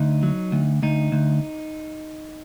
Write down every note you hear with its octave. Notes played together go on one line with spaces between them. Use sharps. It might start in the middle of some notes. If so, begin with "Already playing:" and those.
Already playing: D2 D#4
F#3
D2
D2 D#4
D2